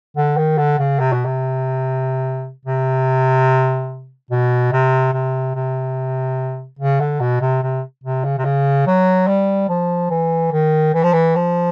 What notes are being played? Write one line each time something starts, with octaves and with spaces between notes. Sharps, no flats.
D3
D#3
D3
C#3
C3
B2
C3
C3
B2
C3
C3
C3
C#3
D3
B2
C3
C3
C3
C#3
C3
C#3
F#3
G3
F3
E3
D#3
E3
F3
E3
F3